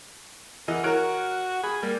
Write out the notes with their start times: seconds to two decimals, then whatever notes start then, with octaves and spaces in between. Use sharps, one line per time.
0.68 E3 A#4 D#5 F#5
0.84 F#4 A#4 C#5 F6 F#6 D7
1.63 G#4 B5
1.83 G3 A#3 G4 A#4